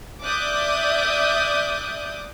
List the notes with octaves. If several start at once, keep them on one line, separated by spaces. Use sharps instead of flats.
D5 E5 D6 D#6 F#6 G6